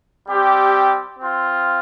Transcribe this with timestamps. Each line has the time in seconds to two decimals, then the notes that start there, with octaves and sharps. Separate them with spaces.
0.28 G3 C4 G4
1.19 C4 F4